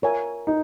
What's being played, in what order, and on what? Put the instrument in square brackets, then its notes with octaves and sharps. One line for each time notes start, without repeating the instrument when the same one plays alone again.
[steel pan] F4 A#4 C#5 E5 G#5
[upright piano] D#4